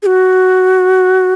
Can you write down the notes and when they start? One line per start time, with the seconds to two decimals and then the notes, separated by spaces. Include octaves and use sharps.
0.03 G#4
0.06 F#4